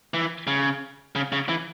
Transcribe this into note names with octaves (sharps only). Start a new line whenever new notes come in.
E3
C#3
C#3
C#3
E3